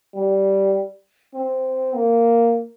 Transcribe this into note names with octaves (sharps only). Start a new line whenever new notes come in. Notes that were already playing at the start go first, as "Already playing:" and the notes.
G3
C4
A#3